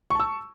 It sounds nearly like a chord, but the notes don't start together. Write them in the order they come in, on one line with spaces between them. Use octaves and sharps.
C#6 A5 E6